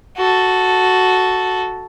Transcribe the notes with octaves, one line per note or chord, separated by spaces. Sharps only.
F#4 A4